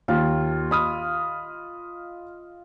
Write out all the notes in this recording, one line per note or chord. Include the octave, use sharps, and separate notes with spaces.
D#2 F4
D#5 B5 D#6 F6